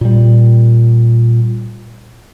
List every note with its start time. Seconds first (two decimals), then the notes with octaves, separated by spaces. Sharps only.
0.01 A#2 G3